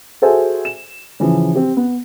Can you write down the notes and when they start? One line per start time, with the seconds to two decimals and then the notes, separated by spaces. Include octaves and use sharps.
0.22 F#4 G#4 A4 C5 E5 G#5
0.65 E7
1.20 C#3 E3 F3
1.55 C4 G4
1.77 B3